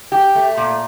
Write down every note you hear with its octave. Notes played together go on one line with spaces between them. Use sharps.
G4
A3
A#2